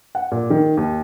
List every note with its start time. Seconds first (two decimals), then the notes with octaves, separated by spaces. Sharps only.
0.15 F#5
0.31 A#2
0.50 D#3
0.77 D#2